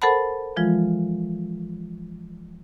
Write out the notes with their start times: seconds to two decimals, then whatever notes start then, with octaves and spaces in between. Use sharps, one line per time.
0.02 A4 A#4 C5 F#5 A5 B5
0.57 E3 F3 G#3 F4